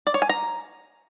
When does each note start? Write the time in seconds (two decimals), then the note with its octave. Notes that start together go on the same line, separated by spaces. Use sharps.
0.07 D5
0.14 C#5
0.22 G#5
0.29 A#5